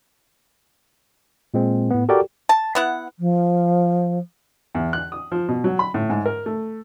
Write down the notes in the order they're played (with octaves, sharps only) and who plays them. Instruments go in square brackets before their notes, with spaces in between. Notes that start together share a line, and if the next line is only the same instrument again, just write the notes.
[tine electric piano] A#2 G#3 C4
A2 B3
F#4 G4 A4 A#4 D5 G5
[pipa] A5
B3 E4 F#5
[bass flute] F3
[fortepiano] E2
F#6
D#6
F3
B2
F#3
B5
A2
G#2
A#4
A3